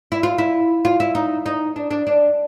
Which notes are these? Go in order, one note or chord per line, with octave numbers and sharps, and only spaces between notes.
E4
F4
E4
F4
E4
D#4
D#4
D4
D4
D4